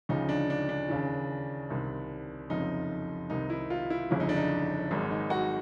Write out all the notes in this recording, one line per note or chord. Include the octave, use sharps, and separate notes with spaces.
D2 C#3 F3 D#4
D4
D4
D4
D#2 C#3 E3
C2 C3 D#3
F#1 F2 C3 D#4
C2 C3 D#3 D#4
E4
F4
E4
G1 F2 C#3 F#3 E4
D#4
D4
D#4
G#1 G#2 D#3 F#3
D#4
F#4